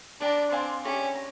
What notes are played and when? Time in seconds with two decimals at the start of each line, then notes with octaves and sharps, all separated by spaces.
0.20 D4 B4 D5 G5 A#5
0.51 C4 D5 F5 G#5 C6
0.83 C#4 E4 G4 A#4 D5
1.15 A#5